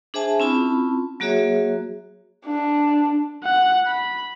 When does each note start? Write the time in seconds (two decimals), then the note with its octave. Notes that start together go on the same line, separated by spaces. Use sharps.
0.14 D4 G#4 C5 E5 G#5 A5
0.40 C4 C#4 E4 F4 A5 B5
1.20 F#3 A#3 F#4 G#4 C#5 E5
2.46 D4
3.44 F#5
3.87 B5